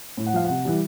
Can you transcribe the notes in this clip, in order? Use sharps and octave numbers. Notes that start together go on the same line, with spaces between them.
A2
F#5
F3 F5
C3 F#5
E3 G3